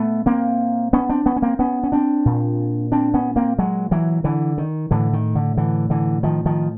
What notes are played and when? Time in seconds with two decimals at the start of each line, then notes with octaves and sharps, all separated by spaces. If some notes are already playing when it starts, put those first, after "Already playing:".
Already playing: A#2 A3 B3
0.26 A#3 C4
0.93 B3 C#4
1.09 C4 D4
1.26 B3 C#4
1.36 C#4
1.42 A#3 C4
1.59 B3 C#4
1.83 C#4
1.92 C4 D4
2.25 A#2
2.92 C4 D4
3.14 B3 C#4
3.36 A#3 C4
3.59 F#3 G#3
3.91 E3 F#3
4.24 D3 E3
4.58 D#3
4.91 A2 D3 E3
5.13 D#3
5.35 D3
5.57 D3 E3
5.90 D3 E3
6.23 D#3 F3
6.46 D#3 F3